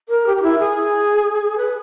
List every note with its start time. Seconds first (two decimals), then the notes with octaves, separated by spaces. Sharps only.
0.09 A#4
0.26 G4
0.37 G4
0.43 E4
0.59 G#4
1.58 B4